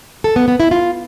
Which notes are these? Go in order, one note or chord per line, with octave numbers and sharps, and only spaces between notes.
A4
B3
B3
E4
F4